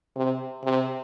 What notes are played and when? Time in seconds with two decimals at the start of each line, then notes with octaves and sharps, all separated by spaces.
0.16 C3
0.64 C3